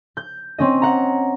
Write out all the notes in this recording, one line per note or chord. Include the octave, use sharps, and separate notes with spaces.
G6
C4 C#4 D#5
F#5 A#5